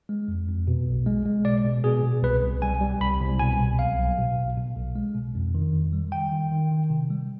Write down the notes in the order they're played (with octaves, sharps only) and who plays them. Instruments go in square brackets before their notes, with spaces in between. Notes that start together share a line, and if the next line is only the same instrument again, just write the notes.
[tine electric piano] G#3
F2
F2
B2
B1
G#3
G#3
B2 D5
B2
B2 G#4
B2
C2 B4
C2
G3 G#5
G3
C2 B5
C2
B2 G#5
C2
B1 F5
B1
B2
B1
B2
B1
G#3
B2
F2
D#3
F2
G3
D#3 G5
D#3
D#3
D#3
C3
G3